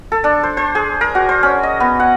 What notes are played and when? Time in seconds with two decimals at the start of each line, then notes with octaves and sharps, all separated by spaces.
0.12 A4
0.24 D4
0.43 C5
0.57 C5
0.75 G#4
1.01 A#4
1.15 F#4
1.29 C5
1.43 C#4
1.63 D#5
1.80 B3
2.00 F#5